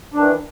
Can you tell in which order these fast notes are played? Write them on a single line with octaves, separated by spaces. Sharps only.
D4 D#3 E3